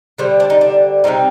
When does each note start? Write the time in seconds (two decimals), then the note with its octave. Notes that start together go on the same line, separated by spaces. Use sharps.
0.18 D3 G3 C4 C5
0.40 D4
0.50 D#4
0.61 D4
1.04 C3 D#3 G3 C4 D#4